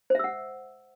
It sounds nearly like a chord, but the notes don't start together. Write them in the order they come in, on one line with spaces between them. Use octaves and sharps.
C5 E5 E6 F#5